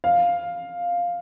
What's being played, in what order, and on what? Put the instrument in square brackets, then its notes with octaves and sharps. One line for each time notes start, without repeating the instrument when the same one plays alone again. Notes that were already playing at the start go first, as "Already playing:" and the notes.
[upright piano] F5